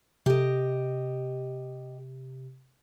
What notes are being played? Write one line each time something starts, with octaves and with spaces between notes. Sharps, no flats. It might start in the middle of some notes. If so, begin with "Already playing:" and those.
C3 G4 D#5